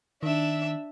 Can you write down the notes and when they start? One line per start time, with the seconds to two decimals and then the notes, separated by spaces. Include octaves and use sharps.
0.23 D#3 D4 E5